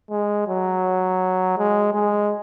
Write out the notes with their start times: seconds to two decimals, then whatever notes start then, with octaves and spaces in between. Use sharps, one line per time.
0.11 G#3
0.48 F#3
1.58 G#3
1.94 G#3